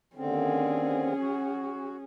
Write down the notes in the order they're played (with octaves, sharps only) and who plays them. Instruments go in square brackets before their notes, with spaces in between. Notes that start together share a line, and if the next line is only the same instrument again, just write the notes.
[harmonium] D#2 D3 C4 [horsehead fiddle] C#4 G#4
[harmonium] F#4